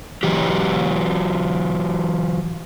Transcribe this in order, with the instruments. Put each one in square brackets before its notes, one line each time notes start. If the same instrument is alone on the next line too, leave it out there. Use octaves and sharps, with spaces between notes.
[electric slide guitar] E3 F#3 G4